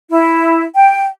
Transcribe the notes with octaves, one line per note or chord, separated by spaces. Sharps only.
E4
G5